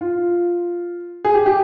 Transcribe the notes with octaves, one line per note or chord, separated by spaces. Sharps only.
F4
G#4
G4
G4